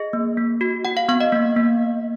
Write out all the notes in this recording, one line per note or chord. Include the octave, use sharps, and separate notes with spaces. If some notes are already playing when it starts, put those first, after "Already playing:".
Already playing: G#4 D#5
A#3
A#3
F#4
F#4 F#5
F5
B3 F5
D#5
A#3
A#3